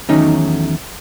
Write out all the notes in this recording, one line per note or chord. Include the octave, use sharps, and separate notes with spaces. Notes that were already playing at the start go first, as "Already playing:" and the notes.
E2 D#3 F#3 A3 C#4 D#4